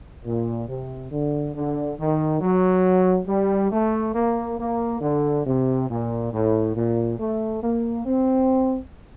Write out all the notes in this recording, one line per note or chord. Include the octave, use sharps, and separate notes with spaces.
A#2
C3
D3
D3
D#3
F#3
G3
A3
A#3
A#3
D3
C3
A#2
A2
A#2
A3
A#3
C4